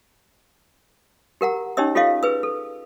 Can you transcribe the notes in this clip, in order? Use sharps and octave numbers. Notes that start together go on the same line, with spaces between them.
G4 A#4 F#5 A#5
C#4 D#4 G4 C#5 D#5 E6
F4 G4 A4 C#5 D#5 F5
G#4 B4 E6
A4